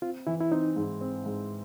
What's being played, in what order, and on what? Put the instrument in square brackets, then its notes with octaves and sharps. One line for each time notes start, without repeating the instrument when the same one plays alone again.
[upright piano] C4 [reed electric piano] F4
[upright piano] E3 [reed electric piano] E4
[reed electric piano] E4
[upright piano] C4 [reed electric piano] D#4
[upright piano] G#2
C4
G#2